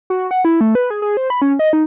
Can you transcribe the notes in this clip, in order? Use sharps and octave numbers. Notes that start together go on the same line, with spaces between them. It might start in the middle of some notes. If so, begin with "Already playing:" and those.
F#4
F#5
E4
A3
B4
G#4
G#4
C5
B5
C#4
D#5
D#4